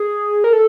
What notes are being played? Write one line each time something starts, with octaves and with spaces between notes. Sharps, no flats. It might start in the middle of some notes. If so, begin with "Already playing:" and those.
Already playing: G#4
A#4
A4